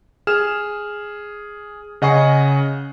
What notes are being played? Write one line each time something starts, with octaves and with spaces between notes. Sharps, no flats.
G#4 F6 E7
C#3 D#5 F#5 G#5 C#6 C7